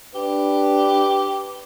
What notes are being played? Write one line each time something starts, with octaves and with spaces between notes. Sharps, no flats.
D4 G4 B4